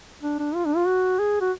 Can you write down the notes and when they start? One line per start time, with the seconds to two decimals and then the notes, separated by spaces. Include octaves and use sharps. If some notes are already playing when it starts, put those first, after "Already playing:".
0.23 D4
0.39 D4
0.55 F4
0.66 D4
0.77 F4
0.87 F#4
1.19 G#4
1.41 F#4